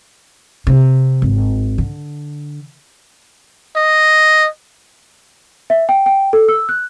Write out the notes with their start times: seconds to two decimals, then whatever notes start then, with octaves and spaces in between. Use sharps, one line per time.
0.67 C3
1.22 G#1
1.78 D3
3.76 D#5
5.70 E5
5.89 G5
6.06 G5
6.33 A4
6.48 E6
6.69 F#6